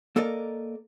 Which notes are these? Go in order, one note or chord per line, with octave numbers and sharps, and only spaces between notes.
A#3 A4 A#4 D5 D#5